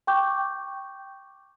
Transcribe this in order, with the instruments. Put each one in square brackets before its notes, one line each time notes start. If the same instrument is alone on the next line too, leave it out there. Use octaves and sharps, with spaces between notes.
[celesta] G5 C#6 D6 G6